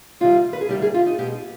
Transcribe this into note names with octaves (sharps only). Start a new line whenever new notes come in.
D2 C3 D#3 G3 F4
B4
G#4
D2 C3 D#3 G3 G4
G#4
F4
D#4
B2 G#3 G4